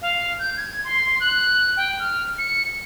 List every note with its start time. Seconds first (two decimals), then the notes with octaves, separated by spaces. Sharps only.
0.02 F5
0.39 G6
0.57 G#6
0.84 C6
1.20 F#6
1.77 G5
2.00 F6
2.39 C#7